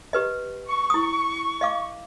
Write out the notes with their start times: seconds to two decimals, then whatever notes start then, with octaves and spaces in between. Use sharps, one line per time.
0.13 G4 B4 D#5
0.67 C#6
0.90 E4 D#6
1.61 D#5 F5 D6